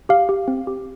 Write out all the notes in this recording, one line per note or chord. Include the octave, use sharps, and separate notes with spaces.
G4 F5
G4
C4
G4